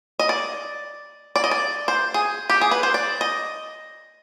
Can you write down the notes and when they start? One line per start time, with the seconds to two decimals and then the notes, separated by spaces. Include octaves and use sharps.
0.19 D#5
0.29 D5
1.36 D5
1.44 D#5
1.51 D5
1.88 C5
2.14 G#4
2.50 G4
2.61 G#4
2.71 B4
2.83 C5
2.94 D5
3.21 D#5